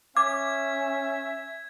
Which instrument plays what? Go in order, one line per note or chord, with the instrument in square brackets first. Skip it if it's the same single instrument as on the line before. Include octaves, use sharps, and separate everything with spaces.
[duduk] C#4 [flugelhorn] E5 [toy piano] D6 [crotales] G#6